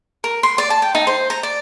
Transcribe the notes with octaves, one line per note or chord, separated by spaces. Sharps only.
A#4
C6
D5
A5
G5
D#4
C5
A#5
D5